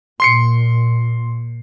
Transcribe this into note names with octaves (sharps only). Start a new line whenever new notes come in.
A#2 C6 C7 C#7